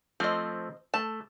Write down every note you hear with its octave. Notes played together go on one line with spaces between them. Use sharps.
F3 A3 C4 C5 D#5
A3 A5